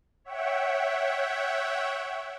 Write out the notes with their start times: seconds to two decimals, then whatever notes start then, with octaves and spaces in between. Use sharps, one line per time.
0.24 C#5 E5 F#5 G5